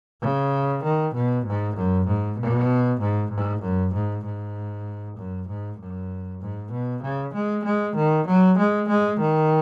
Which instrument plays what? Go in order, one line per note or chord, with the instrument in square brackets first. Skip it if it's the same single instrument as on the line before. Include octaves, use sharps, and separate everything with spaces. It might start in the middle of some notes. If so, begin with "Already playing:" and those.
[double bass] C#3
D#3
B2
G#2
F#2
G#2
B2
G#2
G#2
F#2
G#2
G#2
F#2
G#2
F#2
G#2
B2
C#3
G#3
G#3
D#3
F#3
G#3
G#3
D#3